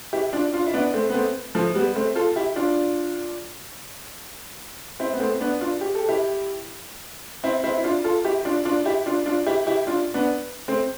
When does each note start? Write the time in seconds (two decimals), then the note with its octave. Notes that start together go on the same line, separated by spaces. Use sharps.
0.13 E4 G4
0.33 D4 F4
0.53 D4 F4
0.67 E4
0.74 B3 D4
0.94 A3 C4
1.10 B3
1.14 A3 C4
1.55 F3 A3
1.75 G3 B3
1.96 A3 C4
2.15 F4 A4
2.36 E4 G4
2.56 D4 F4
5.00 C4 E4
5.13 B3
5.20 A3 C4
5.40 B3 D4
5.61 D4 F4
5.81 G4
5.95 A4
6.09 E4 G4
7.44 C4 E4
7.64 C4 E4
7.77 E4
7.84 D4 F4
8.04 F4 A4
8.25 E4 G4
8.45 D4 F4
8.65 D4 F4
8.85 E4 G4
9.06 D4 F4
9.26 D4 F4
9.46 E4 G4
9.67 E4 G4
9.87 D4 F4
10.14 B3 D4
10.68 A3 C4